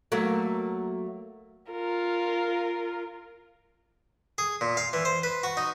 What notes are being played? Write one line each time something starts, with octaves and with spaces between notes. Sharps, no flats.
F#3 A3 A#3
F4 A#4
G#4
A#2
F5
E3
C5
B4
F#4
D#4